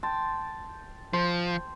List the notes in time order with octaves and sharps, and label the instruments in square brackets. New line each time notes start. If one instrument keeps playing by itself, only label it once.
[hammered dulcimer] G5 A5 C6
[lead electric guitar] F3 [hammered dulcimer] C5